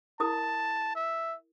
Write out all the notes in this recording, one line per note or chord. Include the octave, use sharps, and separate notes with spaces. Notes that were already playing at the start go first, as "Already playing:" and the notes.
E4 A#4 A5 D#6
E5